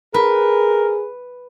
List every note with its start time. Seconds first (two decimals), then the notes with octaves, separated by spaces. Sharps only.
0.14 G#4 A#4 B4